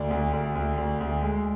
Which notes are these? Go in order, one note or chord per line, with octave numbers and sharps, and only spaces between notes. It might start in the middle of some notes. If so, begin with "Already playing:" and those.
Already playing: D2 D5
D2
D2
D2
D2
D2
G#3